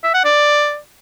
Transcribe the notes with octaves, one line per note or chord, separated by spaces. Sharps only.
E5
F#5
D5